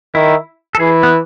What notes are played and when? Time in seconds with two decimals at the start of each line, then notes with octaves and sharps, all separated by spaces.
0.15 D#3 E4
0.75 A4
0.80 E3 G#4
1.03 B3